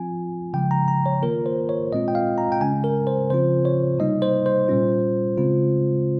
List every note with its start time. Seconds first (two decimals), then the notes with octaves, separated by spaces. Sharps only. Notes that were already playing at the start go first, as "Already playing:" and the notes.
Already playing: F3 C4 F4 G#5
0.53 C#3 F3 G#3 G5
0.71 A#5
0.88 A#5
1.06 C#5
1.22 D#3 A#3 F4 A#4
1.46 C5
1.69 C#5
1.92 A#2 G#3 C4 F4 D#5
2.08 G5
2.15 F5
2.38 A#5
2.52 G5
2.61 C#3 G#3 C#4 G#5
2.84 A#4
3.07 C5
3.30 C#3 F3 C4 F4 C5
3.65 C#5
3.99 C3 G3 A#3 D#4 D#5
4.22 C5
4.46 C5
4.68 A#2 G3 C#4 F4
5.38 C#3 G#3 C4 F4